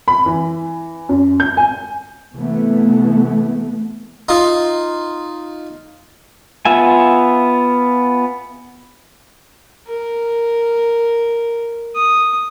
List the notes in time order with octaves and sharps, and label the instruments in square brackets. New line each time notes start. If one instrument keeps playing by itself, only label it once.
[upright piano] B5
E3
F#2
G6
G#5
[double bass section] C3 E3 A3 B3
[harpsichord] D#4 F4
[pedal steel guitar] B3 F4 E5 G#5
[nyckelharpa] A#4
D#6